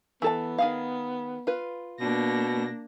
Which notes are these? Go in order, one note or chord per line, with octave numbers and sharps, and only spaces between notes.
E3 B3 A4 A5
D#3 G#4 F5
F4 B4
B2 A#3 D4 A#6